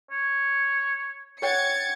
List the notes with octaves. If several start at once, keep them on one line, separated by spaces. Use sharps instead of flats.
C#5
C#5 F#5 G5 G#6 A6 C#7